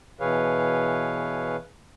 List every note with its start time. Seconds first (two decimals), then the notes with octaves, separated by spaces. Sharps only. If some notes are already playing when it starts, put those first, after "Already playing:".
0.20 B2 E3 G#4 B4 C#5 F5